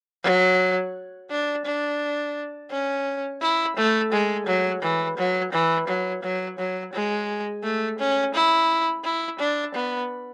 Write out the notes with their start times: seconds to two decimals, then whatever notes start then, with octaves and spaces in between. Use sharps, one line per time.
0.24 F#3
1.30 D4
1.65 D4
2.70 C#4
3.41 E4
3.76 A3
4.12 G#3
4.47 F#3
4.82 E3
5.17 F#3
5.53 E3
5.87 F#3
6.23 F#3
6.58 F#3
6.93 G#3
7.63 A3
7.99 C#4
8.34 E4
9.04 E4
9.39 D4
9.74 B3